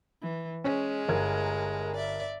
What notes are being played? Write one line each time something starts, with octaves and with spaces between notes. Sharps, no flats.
E3
G#3 C#4
G1 A#4 G#6
D5 E5